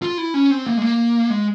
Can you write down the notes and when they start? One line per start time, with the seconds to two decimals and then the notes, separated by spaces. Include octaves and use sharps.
0.02 F4
0.18 E4
0.34 C#4
0.51 C4
0.67 A#3
0.77 G#3
0.82 A#3
1.30 G#3